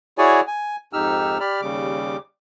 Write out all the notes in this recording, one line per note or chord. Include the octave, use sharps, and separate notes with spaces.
E4 F#4 G#4 C#5 D5 G#5
G#5
F2 G#2 D#4 G4 E6 F6
G4 D5 B5 F6
D#2 C#3 G3 D6